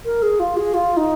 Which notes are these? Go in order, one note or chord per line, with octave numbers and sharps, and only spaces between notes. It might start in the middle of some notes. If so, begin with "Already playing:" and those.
A#4
G#4
F4
G#4
F4
D#4